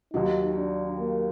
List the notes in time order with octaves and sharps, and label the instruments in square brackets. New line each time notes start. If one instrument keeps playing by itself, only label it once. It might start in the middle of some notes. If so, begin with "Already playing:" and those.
[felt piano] D#2 D#3 F#3 [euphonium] D#4
[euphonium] D4
A#3